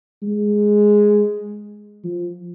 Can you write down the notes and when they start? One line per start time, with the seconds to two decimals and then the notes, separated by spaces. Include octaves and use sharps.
0.22 G#3
2.04 F3